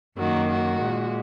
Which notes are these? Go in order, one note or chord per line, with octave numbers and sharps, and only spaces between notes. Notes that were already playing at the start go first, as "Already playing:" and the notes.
F#2 D#3 A#3 F#4
F#4
A#2 G#3